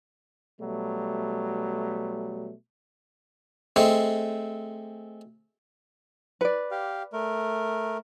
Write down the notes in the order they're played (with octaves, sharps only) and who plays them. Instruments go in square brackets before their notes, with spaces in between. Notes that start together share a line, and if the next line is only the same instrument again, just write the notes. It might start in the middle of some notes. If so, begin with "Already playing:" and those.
[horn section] B2 F#3 G3 A3
[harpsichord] G#3 A3 C4
[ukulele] B4 D5
[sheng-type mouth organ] G4 F5
A3 A#4